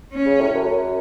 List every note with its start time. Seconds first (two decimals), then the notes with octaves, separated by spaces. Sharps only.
0.12 C#4
0.26 C#3
0.40 A2
0.55 F#2
0.68 F#2